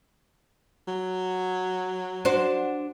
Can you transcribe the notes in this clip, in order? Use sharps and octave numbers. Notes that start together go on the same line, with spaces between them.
F#3
D4 F#4 C5